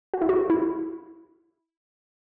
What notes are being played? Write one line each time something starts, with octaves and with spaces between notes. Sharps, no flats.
F#4
E4
F#4
E4